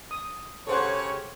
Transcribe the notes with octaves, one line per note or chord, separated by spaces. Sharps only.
D#6
C#3 G4 A4 C5 C#5 F#5